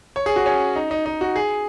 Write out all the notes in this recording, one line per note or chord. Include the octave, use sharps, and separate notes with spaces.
C#5
G#4
F#4
C#4
D#4
D#4
D#4
F#4
G#4